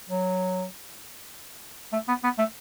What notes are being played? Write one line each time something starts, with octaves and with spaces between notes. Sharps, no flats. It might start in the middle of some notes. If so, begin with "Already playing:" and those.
F#3
A3
B3
B3
A3